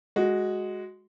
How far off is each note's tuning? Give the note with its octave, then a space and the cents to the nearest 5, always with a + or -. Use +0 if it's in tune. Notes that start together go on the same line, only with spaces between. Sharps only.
G#3 +0 F#4 +0